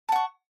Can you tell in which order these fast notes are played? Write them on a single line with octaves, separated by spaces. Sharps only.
A5 F#5 C#6